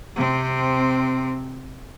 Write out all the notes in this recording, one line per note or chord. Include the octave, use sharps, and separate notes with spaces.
C3 C4